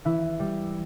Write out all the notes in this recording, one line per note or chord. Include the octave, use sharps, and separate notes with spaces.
E3 E4
G3